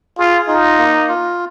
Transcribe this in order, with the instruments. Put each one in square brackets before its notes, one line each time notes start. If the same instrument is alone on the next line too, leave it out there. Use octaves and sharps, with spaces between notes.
[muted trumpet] F4 [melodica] G#4
[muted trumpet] D#4 [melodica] F4
[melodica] A#3
F4